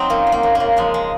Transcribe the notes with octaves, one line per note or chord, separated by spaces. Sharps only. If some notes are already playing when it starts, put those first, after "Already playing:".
Already playing: F#3 C4 D#4
F#2 A#3
F#3
A#3
F#2
A#3
C#3
F3 G#3
G#3